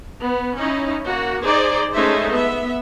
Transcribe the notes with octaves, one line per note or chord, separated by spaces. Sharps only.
B3
C#4 D#4 E4
A#3 F#4
D#4 G#4 C5 D5
G#3 A3 C#4 D#4 C5 E5
B3 E5